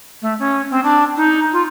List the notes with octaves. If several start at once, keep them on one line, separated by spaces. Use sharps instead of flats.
A3
C#4
C4
D4
D#4
F4